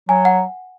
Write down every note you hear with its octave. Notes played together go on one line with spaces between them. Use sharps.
F#3 G#5
F#5